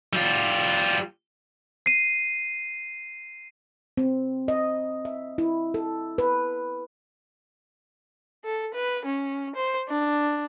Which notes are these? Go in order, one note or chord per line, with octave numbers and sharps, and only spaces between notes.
G3 F4
C7 D#7
C4
D#5
E5
E4
A4
B4
A4
B4
C#4
C5
D4